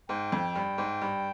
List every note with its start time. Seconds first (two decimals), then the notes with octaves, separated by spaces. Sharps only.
0.09 G#2 G5
0.32 F2
0.56 G2
0.78 G#2
1.02 G2